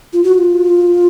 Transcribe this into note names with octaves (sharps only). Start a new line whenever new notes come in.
F4
F#4
F#4
F4